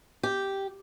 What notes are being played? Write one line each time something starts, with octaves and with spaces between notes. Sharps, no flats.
G4